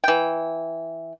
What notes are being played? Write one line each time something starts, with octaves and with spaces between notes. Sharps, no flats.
E3 G5